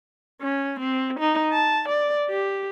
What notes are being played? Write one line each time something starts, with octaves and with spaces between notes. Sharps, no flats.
C#4
C4
D#4
A5
D5
G4